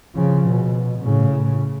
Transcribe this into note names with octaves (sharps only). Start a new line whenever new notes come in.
C#3 F3
B2
A2 C#3